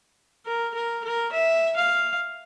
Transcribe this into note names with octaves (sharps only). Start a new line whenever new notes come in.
A#4
A#4
A#4
E5
F5